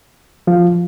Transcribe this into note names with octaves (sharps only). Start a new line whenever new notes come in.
F3 F4